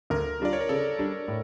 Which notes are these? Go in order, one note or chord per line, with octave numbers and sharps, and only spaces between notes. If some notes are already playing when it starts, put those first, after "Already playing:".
D2 A#4
D3 G3 D4 F4 D5
C#5
A#4
C#3 A4
G3 D4
A2